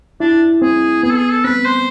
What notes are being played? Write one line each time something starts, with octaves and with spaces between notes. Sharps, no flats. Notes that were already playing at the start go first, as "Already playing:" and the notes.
D4 E4
C4 G#4
B3 G#4
A4
G#4
A4
C4 B4
C5